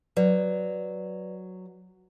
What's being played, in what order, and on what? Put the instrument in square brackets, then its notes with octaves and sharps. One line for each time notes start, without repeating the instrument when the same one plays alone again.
[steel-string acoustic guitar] F#3 [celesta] B4 D5